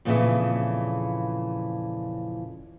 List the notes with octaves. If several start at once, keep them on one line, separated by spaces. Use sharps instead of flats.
F2 A#2 C#3 E3 G#4 E5